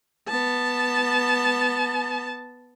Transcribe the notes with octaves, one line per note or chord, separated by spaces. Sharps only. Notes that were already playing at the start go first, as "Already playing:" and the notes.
B3 A5